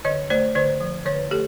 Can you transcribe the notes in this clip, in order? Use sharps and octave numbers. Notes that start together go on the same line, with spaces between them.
D3 C#5 D#5
A3 C5 D5
D3 C5 D5
F3
D3 B4 C#5
A3 G4 A4